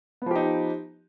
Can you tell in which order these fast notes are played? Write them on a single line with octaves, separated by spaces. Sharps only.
B3 F3 G4 D#4